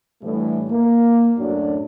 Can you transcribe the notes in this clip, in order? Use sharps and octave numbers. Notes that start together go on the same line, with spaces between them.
A2 D3 E3 G3 A3
A#3
F#2 A2 F#3 D4 D5